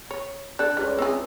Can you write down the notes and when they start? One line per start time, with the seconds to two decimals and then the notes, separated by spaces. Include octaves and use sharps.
0.11 C#5
0.59 D4 A4 D5 F#6
0.77 C#2 G3
0.99 C4 E4 G#4